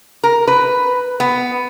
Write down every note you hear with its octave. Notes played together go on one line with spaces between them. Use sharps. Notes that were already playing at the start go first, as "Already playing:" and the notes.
A#4
B4
B3